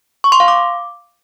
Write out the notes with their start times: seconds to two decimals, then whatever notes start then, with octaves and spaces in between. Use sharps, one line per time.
0.24 C#6
0.32 C6
0.40 F5
0.48 D6